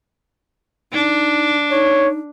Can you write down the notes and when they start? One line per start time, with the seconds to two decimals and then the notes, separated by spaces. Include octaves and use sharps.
0.93 D4 D#4
1.71 D#4 C#5